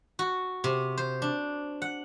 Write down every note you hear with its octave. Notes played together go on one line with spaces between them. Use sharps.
F#4
C3
C5
D4
F#5